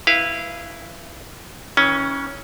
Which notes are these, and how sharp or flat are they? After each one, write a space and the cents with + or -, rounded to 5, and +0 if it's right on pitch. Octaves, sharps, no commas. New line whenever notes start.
E4 +0 B4 +0 F5 -25
E3 -45 C#4 +0